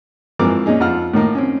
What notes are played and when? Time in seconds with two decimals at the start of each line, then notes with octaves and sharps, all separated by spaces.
0.39 G#2 E3 F3 C4 A#4 D6
0.66 A#2 C#4 D#4 G#4
0.80 F2 F4 F#5 F6
1.13 A2 D#3 A#3
1.35 C4 C#4